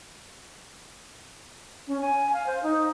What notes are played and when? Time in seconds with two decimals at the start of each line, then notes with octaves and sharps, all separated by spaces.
1.88 C#4
2.01 G#5
2.33 F5
2.47 C5
2.63 D#4